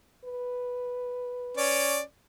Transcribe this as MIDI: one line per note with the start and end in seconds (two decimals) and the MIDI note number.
0.25 2.00 71
1.57 2.00 61
1.57 2.00 74